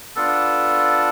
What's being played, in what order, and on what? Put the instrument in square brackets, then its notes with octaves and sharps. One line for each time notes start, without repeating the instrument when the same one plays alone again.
[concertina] B3 D4 F4 A4